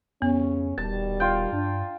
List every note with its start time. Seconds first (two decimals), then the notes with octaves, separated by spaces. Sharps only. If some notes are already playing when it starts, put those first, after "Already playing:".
0.22 F2 C#3 B3 C#4
0.78 D#1 B2 D#3 G3 A5
1.20 F4 G5
1.52 G2 D4